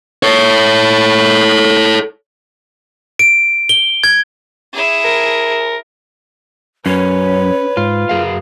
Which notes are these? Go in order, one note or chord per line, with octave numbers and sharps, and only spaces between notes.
A4 C#5
D7
G7
G#6
E4 G#4
A#4
F#2 C#4 B4 C#5
G#2 F4
F#2 G#4 F5